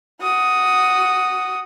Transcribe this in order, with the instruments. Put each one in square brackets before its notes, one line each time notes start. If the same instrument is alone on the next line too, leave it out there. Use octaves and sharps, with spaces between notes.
[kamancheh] F#4 D#6